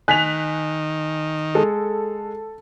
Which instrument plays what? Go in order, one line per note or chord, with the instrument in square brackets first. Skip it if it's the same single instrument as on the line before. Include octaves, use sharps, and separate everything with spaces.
[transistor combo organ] D#3 [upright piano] G#5 [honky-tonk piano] F#6 B6 F7
[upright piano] G#3 [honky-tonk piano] A4